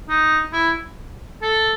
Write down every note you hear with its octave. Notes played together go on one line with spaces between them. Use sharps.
D#4
E4
A4